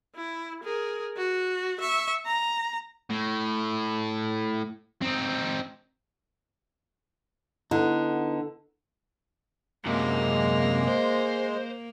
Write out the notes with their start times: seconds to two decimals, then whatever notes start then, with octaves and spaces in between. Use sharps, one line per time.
0.16 E4
0.64 G#4 A#4
1.17 F#4
1.81 E5 C#6
2.26 A#5
3.10 A2
5.02 C4 D#4
7.71 D3 B3 D#4 E4
9.86 F#2 C3 G#3 A#3
10.88 C5